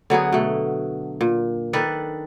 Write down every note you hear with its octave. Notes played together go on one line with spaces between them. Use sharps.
D3 F#3 B3 G#4
B2 A3
A#2
D#3 D4 A4 B4